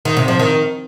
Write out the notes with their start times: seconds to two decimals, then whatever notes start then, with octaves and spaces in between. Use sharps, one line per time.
0.05 D#3
0.17 C3
0.28 F3
0.39 D#3